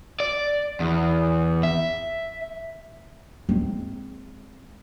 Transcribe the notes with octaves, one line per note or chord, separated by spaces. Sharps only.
D5
E2
E5
G#3 C4